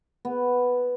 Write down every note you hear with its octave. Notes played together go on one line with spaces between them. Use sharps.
B3